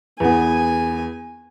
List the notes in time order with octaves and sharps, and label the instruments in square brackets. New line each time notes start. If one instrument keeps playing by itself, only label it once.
[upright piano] E2 B3 [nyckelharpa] G#5